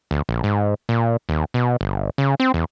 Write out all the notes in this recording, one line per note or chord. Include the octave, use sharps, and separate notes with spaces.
D2
A#1
G#2
A#2
D#2
B2
G1
C#3
C4
E2